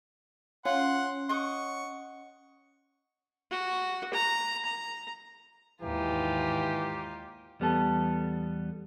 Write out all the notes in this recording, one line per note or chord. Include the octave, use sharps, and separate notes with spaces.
C#4 F4 F#5 C6
D#5 F#5 C#6 D6
F#4
A#5
A#5
D#2 G#2 E3 D#4 F4 G4
E2 G3 B3 A4